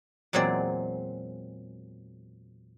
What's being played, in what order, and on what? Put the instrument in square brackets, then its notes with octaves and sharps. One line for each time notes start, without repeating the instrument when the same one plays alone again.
[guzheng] E2 A#2 F#3 G#3 C4 D5